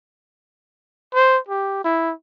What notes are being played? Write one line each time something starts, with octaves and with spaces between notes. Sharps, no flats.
C5
G4
E4